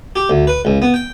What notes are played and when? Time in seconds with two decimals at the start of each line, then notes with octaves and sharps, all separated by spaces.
0.16 G4
0.30 D2
0.47 B4
0.65 C#2
0.82 B3
0.94 G5